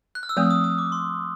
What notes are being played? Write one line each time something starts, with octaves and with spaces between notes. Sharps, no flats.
F#6
F6
E6
F3 A3 C4 D#6
D#6
D#6
D6
C6